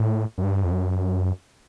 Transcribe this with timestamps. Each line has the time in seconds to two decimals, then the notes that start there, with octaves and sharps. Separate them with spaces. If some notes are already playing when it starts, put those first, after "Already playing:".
Already playing: A2
0.38 F#2
0.43 G2
0.64 F2
0.72 F#2